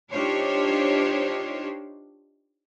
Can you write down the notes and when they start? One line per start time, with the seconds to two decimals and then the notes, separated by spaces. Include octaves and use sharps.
0.12 D4 D#4 F4 G4 C5 C#5